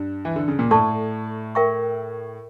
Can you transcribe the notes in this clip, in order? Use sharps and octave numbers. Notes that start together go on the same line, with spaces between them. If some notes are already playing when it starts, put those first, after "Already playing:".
Already playing: G2
E3
D3
C#3
A#2
A2 A4 D5 A5 C#6
A#4 E5 G5 C#6